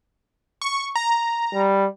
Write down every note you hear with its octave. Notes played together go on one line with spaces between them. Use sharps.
C#6
A#5
G3